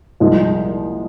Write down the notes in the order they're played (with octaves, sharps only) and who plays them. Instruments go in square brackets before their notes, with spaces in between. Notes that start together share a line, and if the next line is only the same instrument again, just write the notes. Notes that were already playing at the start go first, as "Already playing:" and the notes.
[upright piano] C2 A#2 F3 G#3